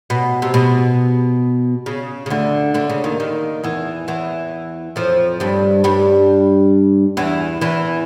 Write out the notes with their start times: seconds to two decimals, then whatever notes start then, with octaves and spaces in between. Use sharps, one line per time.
0.10 B2
0.42 C3
0.54 B2
1.86 C#3
2.26 C#3
2.30 D2 D3
2.74 D2 D3
2.90 C#3
3.04 D#2 D#3
3.20 D#2 D#3
3.64 E2 E3
4.08 E2 E3
4.96 F2 F3
5.40 G2 G3
5.84 G2 G3
7.17 E2 E3
7.61 E2 E3